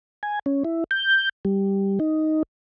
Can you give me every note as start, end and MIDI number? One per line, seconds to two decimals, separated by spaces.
0.23 0.39 80
0.46 0.63 61
0.64 0.84 64
0.91 1.29 91
1.45 1.99 55
2.00 2.43 63